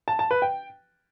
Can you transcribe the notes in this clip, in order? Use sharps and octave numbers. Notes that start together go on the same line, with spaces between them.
A5
A5
B4
G5